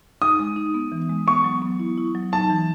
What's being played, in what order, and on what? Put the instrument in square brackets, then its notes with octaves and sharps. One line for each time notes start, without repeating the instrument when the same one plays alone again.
[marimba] D#4 [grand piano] D#6
[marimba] G#3
D#4
B3
E3
G#3
[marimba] B3 [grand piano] C#6
[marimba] F#3
B3
E4
E4
F#3
[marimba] D#4 [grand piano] A5
[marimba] E3